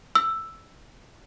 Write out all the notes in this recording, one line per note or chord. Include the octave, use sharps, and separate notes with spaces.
E6